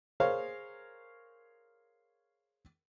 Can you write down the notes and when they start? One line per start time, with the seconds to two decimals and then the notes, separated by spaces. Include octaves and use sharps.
0.20 G#4 A#4 C5 C#5 F5